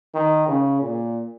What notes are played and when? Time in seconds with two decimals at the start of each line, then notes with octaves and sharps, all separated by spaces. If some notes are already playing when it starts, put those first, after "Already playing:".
0.15 D#3
0.48 C#3
0.82 A#2